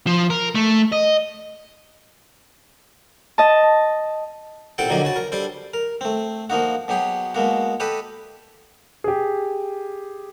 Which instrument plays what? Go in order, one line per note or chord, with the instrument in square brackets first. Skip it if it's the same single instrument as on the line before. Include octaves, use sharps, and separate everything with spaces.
[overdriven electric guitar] F3
A#4
A3
D#5
[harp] D#5 A5
[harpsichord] A1 A#2 C4 A4 F#5 G5
D3 F3 F#3 A#3 D4 D#4
C#3 F#4 A5
A#4
G3 D4 A4 C5
A#4
A3 C4
F3 A#3 D#4 F#4
B2 F#3 G4 G#4
B2 G#3 A#3 F#4
G4 A4 B4 D#5 A5
[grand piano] G4 G#4